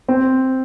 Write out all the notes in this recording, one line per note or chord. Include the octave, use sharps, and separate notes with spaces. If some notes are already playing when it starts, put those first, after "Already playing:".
C4